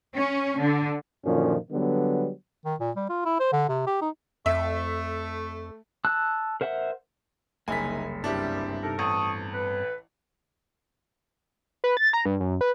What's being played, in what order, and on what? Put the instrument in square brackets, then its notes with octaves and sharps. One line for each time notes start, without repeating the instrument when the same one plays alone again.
[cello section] C#4
D3
[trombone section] F#2 A#2 D3 D#3 F3 C#4
D3 F#3 G3 B3
[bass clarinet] D#3
A#2
G3
F4
E4
C5
D3
C3
G4
D#4
[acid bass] F2 [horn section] A3 [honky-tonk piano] E5
[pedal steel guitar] A5 E6 F#6
A#4 C5 E5 F#5
[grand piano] F#1 C2 [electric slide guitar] A#3 D#4 [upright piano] G#5 B6
[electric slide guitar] G2 B3 C4 [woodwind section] G3 [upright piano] D4 E4 G4
[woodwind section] C3 D#4 A#4 [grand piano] A4
[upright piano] A1 [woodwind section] A5 C#6 D#6
[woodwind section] B4
[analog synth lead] B4
A6
A#5
G2
F#2
B4